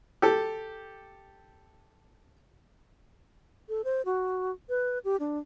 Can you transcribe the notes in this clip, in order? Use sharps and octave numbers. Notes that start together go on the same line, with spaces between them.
G4 A4
A4
C5
F#4
B4
G4
D4